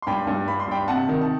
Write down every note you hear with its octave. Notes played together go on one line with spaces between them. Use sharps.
C6
G2 G5 B5
G2
G2 B5
C6
G2 G5 B5
C3 F#5 A5
D#3
A5